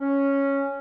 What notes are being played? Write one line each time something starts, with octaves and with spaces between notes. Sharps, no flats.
C#4